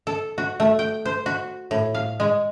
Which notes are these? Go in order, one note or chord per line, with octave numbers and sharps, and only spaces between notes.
A4
F#4
A3
G5
C5
F#4
A2
F5
G#3